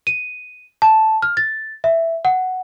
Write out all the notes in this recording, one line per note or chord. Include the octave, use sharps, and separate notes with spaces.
D#7
A5
F6
A6
E5
F#5